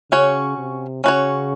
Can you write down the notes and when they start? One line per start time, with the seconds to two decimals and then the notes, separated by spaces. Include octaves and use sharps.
0.12 C#3 C#4 F#4 C#5
0.58 C3
1.04 C#3 C#4 F#4 C#5